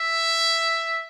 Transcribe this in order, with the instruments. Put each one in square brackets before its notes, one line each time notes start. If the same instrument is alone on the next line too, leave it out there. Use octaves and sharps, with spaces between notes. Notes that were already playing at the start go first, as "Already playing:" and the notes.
Already playing: [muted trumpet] E5